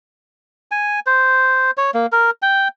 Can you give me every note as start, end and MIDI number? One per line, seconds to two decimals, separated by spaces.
0.71 1.00 80
1.06 1.71 72
1.77 1.91 73
1.94 2.06 58
2.12 2.30 70
2.42 2.68 79